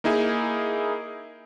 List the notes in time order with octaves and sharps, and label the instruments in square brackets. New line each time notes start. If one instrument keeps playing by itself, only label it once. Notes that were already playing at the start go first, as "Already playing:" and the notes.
[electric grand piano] A#3 D#4 E4 G#4